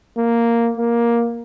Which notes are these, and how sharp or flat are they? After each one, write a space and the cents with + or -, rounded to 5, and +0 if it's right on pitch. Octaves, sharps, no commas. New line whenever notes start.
A#3 -5
A#3 +10